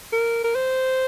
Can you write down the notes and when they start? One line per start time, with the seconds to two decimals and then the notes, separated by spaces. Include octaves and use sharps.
0.12 A#4
0.44 A#4
0.55 C5